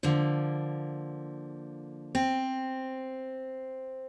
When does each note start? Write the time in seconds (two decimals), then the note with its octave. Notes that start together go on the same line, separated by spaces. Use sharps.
0.03 D3 F3 A#3
2.15 C4